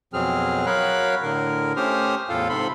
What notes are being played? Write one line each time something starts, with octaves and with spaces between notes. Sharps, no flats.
F2 B2 F#3 C4 G#4 F6
F#3 A#4 C#5 F5 B5 F#6
A2 D3 A#4
A3 C#4 G4 C5 D#6 F6
E2 A2 F4 A4 F5
G#2 C3 A4 B5 C6